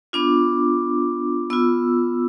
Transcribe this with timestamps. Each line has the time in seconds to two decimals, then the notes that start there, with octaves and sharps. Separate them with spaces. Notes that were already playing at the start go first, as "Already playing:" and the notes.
0.13 B3 D4 F4 D6
1.50 B3 F4 E6